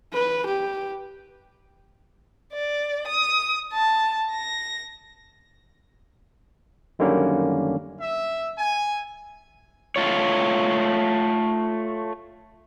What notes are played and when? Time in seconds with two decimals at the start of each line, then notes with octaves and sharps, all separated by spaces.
0.13 B4
0.46 G4
2.53 D5
3.07 D#6
3.73 A5
4.31 A#6
6.99 F#2 D3 D#3 G3 A#3 C#4
8.00 E5
8.57 G#5
9.96 A3 F4 C#5